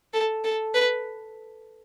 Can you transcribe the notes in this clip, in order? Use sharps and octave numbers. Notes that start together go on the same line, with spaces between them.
A4
A4
B4